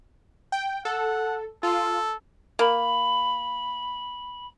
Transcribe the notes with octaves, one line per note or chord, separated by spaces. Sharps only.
G5
A4 F#5
F4 A4
A#3 B5